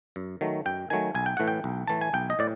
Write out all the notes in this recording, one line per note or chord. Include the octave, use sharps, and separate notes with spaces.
F#2
D#3 F#3 A3
F#2 G5
D#3 F#3 A3 G#5
B1 G#5
G5
A2 E3 A3 F#5
G5
B1
A2 E3 A3 A5
G#5
B1 G5
D#5
A2 D5